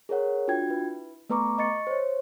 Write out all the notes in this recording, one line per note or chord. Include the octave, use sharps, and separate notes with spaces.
G#4 A#4 C#5 F#5
D4 F4 F#4 G5 G#6
E4 B4
A3 B3 B4 A#5 C#6 D6
D#5 C#6 A6 C#7
C5 C#5